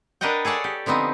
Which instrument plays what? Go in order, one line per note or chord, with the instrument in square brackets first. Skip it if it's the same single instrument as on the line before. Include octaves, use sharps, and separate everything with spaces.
[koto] D4 A#4 B4 D#5 F#5 G5
G#4 A4 C#5 D5 F#5
G4
D3 F3 B3 C4 D#4